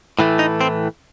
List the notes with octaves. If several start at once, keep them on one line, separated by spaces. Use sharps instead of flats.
A2 E3 A3
D#4
C4